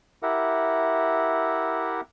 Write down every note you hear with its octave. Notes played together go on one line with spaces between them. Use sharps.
E4 G4 A#4 E5 F#5